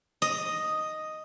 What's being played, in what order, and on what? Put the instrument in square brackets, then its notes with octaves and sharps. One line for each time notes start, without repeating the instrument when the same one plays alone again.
[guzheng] D#5